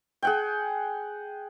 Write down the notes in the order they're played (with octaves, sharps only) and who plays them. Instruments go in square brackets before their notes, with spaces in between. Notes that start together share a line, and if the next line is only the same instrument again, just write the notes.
[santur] G#4 F#5 G5